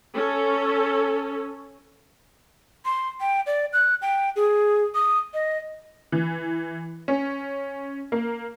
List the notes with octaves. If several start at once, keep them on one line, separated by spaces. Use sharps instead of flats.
C#4 A4
C6
G5
D5
F#6
G5
G#4
D#6
D#5
E3
C#4
A#3